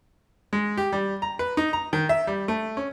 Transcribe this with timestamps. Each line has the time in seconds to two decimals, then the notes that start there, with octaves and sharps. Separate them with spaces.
0.53 G#3
0.77 G4
0.93 G3
1.22 A#5
1.39 B4
1.57 D#4
1.73 A#5
1.93 D#3
2.09 E5
2.27 G3
2.48 A3
2.77 C#4